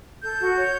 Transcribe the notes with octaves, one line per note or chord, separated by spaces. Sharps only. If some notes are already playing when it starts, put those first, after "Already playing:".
A4 G6
F#4
C#5